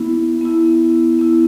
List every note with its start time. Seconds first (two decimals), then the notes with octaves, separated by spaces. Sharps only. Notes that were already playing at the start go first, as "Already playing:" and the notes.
Already playing: B3 E4
0.41 B3 E4
1.19 B3 E4